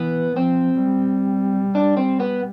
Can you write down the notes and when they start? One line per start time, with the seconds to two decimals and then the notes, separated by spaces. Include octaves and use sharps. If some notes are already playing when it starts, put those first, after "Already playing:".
Already playing: E3 B3
0.36 F3 C4
0.82 G3
1.75 D4
1.97 C4
2.20 B3